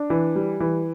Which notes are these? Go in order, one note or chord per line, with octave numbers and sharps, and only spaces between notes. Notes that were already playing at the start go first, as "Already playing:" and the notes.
Already playing: D4
E3
G3
E3